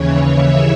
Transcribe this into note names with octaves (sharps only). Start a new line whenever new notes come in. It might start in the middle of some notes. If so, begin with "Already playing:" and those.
Already playing: D#2 C#3 E3 C#5
E5